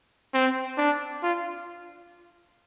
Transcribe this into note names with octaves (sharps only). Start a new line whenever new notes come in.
C4
D4
F4